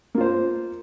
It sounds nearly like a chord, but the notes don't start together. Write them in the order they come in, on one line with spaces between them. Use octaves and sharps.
A#3 F4 C5